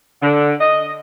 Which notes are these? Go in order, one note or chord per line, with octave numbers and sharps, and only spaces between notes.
D3
D#5